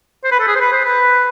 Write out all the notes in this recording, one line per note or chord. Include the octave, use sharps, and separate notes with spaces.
C5
B4
A4
G#4
C5
B4
C5
B4